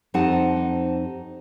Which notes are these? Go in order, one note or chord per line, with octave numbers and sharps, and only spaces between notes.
F2 C4 D#4 G4 F#5 A5